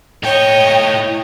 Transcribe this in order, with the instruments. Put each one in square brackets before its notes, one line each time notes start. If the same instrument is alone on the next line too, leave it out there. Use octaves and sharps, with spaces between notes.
[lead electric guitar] A2 G5 [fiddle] C#5 D#5